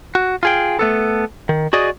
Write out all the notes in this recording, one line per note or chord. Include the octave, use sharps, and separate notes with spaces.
F#4
F4 G#4 G5
A3 B3 A4
D#3
F#4 G#4 D5 D#5